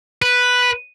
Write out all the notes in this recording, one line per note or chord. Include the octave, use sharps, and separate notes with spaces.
B4